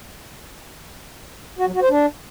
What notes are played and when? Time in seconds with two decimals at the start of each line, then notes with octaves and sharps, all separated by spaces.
1.59 F#4
1.66 F#3
1.74 F#4
1.82 C5
1.90 D4